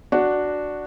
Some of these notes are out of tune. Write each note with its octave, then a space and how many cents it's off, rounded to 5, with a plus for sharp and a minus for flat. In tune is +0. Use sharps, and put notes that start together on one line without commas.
D4 +0 F#4 +0